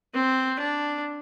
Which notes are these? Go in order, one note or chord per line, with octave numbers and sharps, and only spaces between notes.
C4
D4